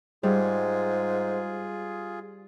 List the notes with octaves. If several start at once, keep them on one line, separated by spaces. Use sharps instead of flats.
G#2 G3 F4 G#4